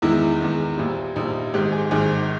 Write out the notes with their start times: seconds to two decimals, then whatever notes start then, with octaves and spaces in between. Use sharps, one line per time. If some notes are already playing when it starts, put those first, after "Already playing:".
0.02 E2 D#3 G#3 E4
0.41 E2 D#3 G#3
0.78 A#1 A#2 G3
1.16 A#1 A#2 G3 D#4
1.54 G#1 G#2 D#3 G4
1.72 G#4
1.91 G#1 G#2 D#3 G#4